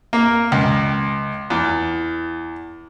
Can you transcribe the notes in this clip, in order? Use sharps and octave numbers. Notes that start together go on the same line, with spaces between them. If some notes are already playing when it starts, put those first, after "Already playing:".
A#3
C#2
E2